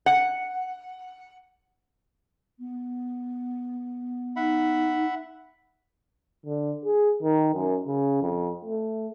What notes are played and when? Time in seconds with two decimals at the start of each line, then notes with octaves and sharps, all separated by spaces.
0.06 F#5
2.59 B3
4.36 D#4 E5 F#5 B5
6.46 D3
6.85 G#4
7.23 D#3
7.54 F#2
7.87 C#3
8.22 F2
8.65 A3